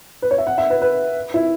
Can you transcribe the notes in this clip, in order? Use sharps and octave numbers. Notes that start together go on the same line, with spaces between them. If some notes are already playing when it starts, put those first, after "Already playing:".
B4
C#5
E5
F#5
E5
B4
B4
E4